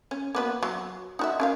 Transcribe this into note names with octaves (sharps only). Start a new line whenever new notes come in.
C#4
A#3 B3 F#4
F#3
D#4 F#4 E5
C#4 A#4 F5